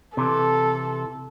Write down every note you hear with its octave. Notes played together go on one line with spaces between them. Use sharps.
C3 E3 A4